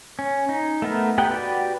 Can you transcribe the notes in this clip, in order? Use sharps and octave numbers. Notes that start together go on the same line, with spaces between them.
C#4
D#4
A3 B3 A#4
B3 D#4 G4 F#5 G5
F#4 G4 B4 D5